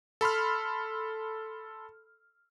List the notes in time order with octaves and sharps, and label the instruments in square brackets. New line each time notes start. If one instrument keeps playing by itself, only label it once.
[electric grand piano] A4 B5 C6 F6